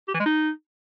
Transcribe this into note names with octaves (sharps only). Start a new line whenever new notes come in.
G4
E3
G#3
D#4